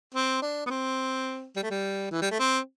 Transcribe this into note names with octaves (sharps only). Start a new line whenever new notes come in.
C4
D4
B3
C4
G3
A3
G3
E3
G3
A3
C4